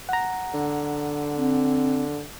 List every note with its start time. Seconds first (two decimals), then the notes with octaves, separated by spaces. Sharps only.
0.09 F#5 A#5
0.54 D3
1.37 C4